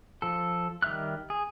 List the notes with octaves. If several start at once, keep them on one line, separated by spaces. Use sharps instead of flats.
F3 A4
D#3 G3 E5 F6 F#6
G#4